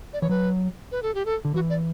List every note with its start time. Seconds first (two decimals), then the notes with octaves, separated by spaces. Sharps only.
0.13 D5
0.22 E3 C#5
0.29 F#3 B4
0.92 B4
1.03 A4
1.15 G4
1.26 A4
1.45 D3
1.54 E3 F#4
1.70 D5